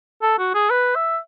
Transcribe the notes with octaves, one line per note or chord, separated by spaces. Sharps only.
A4
F#4
G#4
B4
E5